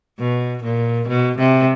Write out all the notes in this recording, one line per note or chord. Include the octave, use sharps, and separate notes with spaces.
B2
A#2
B2
C3